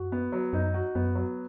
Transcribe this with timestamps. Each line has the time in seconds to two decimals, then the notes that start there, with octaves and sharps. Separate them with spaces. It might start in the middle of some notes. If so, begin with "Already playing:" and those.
Already playing: F#2 F#4
0.12 B3
0.32 F#3
0.53 F#2 D#4
0.74 F#4
0.95 F#2 B3
1.15 F#3